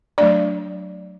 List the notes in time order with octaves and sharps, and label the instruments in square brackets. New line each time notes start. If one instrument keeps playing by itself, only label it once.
[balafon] F#3 A3 D4 D5